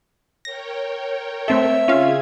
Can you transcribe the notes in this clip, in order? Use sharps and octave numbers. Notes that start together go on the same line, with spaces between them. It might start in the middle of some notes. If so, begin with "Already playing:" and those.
A#4 C#5 G5 A#6
A3 C4 A4 E5
C#3 C#4 F4 G#4 F5 G#6